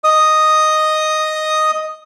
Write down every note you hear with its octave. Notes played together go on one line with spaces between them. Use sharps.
D#5 D#6